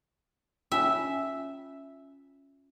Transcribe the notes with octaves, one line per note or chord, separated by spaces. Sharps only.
C#4 F4 E5 G#5